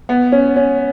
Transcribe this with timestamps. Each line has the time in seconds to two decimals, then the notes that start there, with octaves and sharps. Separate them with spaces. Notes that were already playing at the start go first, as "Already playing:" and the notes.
0.09 B3
0.32 C#4
0.56 C#4